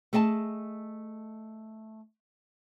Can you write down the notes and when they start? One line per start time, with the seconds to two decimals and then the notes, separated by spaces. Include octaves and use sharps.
0.13 A3 G#4 D#5 G#5 A5